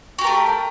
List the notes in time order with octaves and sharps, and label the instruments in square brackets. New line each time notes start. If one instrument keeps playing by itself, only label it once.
[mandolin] F#4
G4
A#4
A3